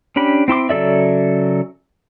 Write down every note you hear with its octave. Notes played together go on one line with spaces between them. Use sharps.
C#4 D4 G4 B5
C4 E4 C6 D6
C#3 F#3 A4 D5 E5